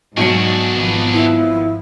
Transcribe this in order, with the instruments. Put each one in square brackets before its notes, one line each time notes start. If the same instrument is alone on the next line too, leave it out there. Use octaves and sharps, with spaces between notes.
[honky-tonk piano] B1 F#3 C#7 [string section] G#2 [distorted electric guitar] D4 G#4
[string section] G#1 F3 B3
[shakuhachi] E4